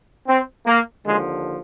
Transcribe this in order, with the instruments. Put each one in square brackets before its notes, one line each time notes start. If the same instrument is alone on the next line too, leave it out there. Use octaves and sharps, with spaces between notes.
[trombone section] C4
A#3
D#2 D3 F3 G#3